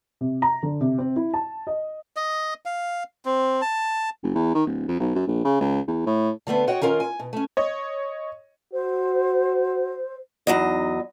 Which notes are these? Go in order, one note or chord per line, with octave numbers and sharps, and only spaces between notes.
C3
A#5
D3
C3
C4
E4
A5
D#5
D#5
F5
C4
A5
F#1
E2
D#3
D1
F2
B1
F#2
A#1
C#3
C#2
E2
A2
D3 A3 B3 C4
F#4 C#5 D#5 F#5 G5
D#3 C#4 F4 A#4
G#5
B2
A3 C#4
C#5 D#5
F#4 C5
E2 F#3 D#4 D#5